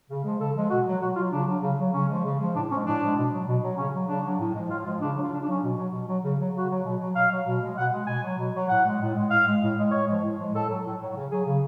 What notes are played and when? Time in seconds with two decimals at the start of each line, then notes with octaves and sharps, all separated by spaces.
0.10 C#3
0.24 F3 G#3
0.40 C#3 A4
0.55 F3 G#3
0.70 B2 F#4
0.86 F#3
1.01 B2 F#4
1.16 F#3 F4
1.32 C#3 D4
1.48 F#3
1.62 C#3
1.79 F#3
1.93 C#3 C#4
2.09 F3 G#3
2.24 C#3
2.39 F3 G#3
2.54 A2 D4
2.71 F3 G#3 C#4
2.85 A2 D4
3.01 F3 G#3
3.17 B2
3.32 F#3
3.46 B2
3.62 F#3
3.77 C#3 C#4
3.93 F#3
4.08 C#3 D4
4.24 F#3
4.39 A2
4.55 F3 G#3
4.70 A2 F4
4.85 F3 G#3 F4
5.00 C#3 D4
5.16 F#3
5.21 F4
5.31 C#3 D4
5.42 D4
5.46 F#3 C#4
5.62 B2
5.77 F#3
5.92 B2
6.08 F#3
6.23 C#3
6.39 F#3
6.54 C#3 F#4
6.69 F#3
6.84 B2
7.00 F#3
7.15 B2 F5
7.31 F#3
7.47 B2
7.62 G#3
7.77 B2 F#5
7.93 G#3
8.07 B2 G#5
8.23 F#3
8.38 B2
8.54 F#3
8.69 A2 F#5
8.85 G#3
9.00 A2
9.15 G#3
9.31 A2 F5
9.46 G#3
9.62 A2
9.77 G#3
9.92 A2 C#5
10.07 F3 G#3
10.23 A2
10.38 F3 G#3
10.53 A2 A4
10.68 F#3
10.85 A2
11.00 F#3
11.16 C#3
11.31 F#3 G#4
11.46 C#3